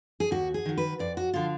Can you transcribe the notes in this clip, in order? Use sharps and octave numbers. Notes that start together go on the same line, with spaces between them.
G#4
D#2 F#4
G#4
D#3 F#3
B4
F2 D5
F#4
D3 F3 F4